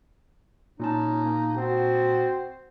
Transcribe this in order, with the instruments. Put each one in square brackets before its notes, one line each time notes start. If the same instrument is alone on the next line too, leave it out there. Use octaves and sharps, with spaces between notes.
[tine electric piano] A#2 A5 [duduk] C#4 [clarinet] D#4
[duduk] A#3
[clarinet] C4 [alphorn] F#4 [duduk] C5